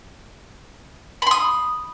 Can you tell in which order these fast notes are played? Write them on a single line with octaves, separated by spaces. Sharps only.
B5 C6 D#6